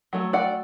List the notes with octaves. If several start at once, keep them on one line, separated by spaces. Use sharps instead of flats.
F#3 A3
D5 F#5